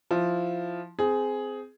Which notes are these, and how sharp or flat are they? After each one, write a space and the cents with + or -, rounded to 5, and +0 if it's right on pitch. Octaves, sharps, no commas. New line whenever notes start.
F3 +0 E4 +0
C4 -15 G#4 +10